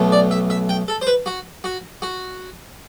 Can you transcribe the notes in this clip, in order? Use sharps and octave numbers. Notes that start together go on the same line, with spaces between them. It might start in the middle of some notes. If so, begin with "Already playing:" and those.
Already playing: B1 B2 A3
D5
E5
E5
G5
A4
C5
B4
F#4
F#4
F#4